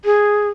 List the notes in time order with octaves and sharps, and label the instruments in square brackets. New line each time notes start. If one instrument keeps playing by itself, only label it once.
[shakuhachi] G#4